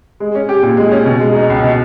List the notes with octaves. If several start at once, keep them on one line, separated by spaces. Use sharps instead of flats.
G#3
C#4
G4
A#2
G#3
C#4
B2
G#3
D#4
C#2
B2